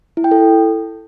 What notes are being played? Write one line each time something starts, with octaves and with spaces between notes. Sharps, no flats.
E4
G5
A4